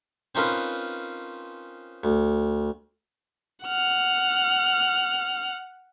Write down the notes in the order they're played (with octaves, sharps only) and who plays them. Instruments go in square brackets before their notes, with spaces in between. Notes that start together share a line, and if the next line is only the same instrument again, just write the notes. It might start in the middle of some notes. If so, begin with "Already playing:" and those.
[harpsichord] C4 C#4 D#4 F4 A#4 B4
D2
[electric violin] F#5 F6